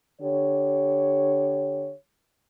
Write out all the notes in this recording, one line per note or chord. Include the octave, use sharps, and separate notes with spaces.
D3 G4 C#5